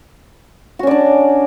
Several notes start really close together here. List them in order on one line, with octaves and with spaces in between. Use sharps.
F#4 C#4 D5 D4